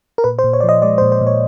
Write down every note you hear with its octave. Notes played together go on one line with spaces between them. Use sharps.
A#4
A#2 B4
C5
A#2
C#5
D5
F3
D#5
G#3 D5
C5
A#2
C5
A#2
C#5